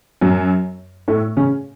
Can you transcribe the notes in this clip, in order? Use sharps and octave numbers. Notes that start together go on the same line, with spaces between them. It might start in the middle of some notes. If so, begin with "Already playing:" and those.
F#2 F#3
A2 A3
C#3 C#4